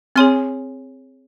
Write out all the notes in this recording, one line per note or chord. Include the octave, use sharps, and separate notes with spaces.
C4 G#4 C#5 G#5 C6 F6